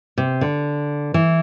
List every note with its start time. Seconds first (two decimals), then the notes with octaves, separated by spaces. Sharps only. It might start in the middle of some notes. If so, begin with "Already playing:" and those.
0.18 C3
0.41 D3
1.14 E3